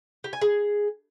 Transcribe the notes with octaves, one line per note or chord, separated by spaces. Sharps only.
G4
G#5
G#4